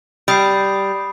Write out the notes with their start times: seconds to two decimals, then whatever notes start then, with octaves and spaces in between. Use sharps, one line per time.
0.28 G3 B5 D#6 G6 C7